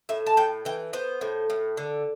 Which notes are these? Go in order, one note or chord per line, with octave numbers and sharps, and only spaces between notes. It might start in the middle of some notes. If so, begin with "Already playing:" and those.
A2 E5
A5
A2 G5
E3 G5
B3 C5
A2
A2
D3